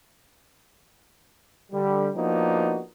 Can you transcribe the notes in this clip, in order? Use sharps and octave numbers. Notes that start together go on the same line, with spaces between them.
D3 G3
F3 A#3 B3 D4 D#4 F#4